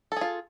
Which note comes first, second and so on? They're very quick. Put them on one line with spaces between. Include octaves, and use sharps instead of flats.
A4 G#4 F4